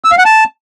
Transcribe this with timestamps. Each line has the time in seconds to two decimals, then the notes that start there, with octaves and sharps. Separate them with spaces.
0.04 E6
0.11 F5
0.18 F#5
0.25 A5